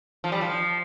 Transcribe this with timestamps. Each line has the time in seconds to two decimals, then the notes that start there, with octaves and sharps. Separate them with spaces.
0.24 F3
0.32 G3
0.41 F3